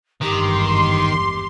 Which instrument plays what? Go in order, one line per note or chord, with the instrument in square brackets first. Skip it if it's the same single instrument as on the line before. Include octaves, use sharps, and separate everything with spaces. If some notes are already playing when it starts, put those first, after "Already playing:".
[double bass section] G#1 E2 G2 [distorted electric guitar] D#3 [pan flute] G4 [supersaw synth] C6